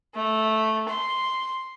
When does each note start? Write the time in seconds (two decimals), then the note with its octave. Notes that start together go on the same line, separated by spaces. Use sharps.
0.15 A3
0.89 C6